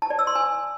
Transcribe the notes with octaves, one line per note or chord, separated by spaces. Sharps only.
A5
D5
E6
C6
G#5